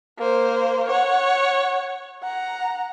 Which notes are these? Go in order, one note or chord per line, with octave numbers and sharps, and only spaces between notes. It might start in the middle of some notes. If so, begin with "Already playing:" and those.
A#3 C5
C#5 F#5
F#5 A#5